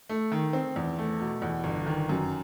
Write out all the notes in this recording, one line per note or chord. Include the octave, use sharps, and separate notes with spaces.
A3
D#3
C4
E2
A3
B2
E2
G1
D#3
F#2